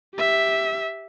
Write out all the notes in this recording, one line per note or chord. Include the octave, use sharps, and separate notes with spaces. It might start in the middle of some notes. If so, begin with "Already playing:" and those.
G4 E5